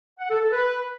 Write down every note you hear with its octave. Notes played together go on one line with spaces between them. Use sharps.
F#5
A4
A4
B4